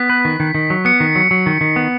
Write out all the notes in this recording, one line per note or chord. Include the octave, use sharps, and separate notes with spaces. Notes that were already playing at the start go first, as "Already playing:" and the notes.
Already playing: B3 B6
B4
D#3
D#3
D#3
F#3
B3 C#7
D#3
F#3
F#3
D#3
D#3
B3